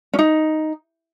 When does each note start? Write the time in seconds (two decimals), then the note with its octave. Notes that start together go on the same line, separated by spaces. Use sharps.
0.13 C#4
0.19 D#4